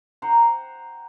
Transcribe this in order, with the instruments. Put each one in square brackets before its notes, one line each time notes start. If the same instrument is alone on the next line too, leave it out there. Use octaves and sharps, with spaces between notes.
[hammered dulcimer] C5 F#5 G5 A#5